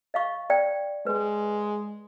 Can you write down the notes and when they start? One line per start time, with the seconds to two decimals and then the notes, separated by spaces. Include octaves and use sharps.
0.14 D#5 F5 C#6
0.50 D5 G5
1.07 G#3 B4